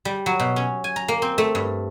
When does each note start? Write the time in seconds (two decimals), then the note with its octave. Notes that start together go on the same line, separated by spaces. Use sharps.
0.05 G3
0.26 F#3
0.40 B2
0.56 C#4
0.84 G#5
0.96 A#5
1.08 A#3
1.22 C4
1.38 A3
1.55 G2